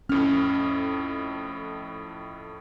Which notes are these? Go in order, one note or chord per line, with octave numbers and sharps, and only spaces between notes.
F2 A2 C#4 F6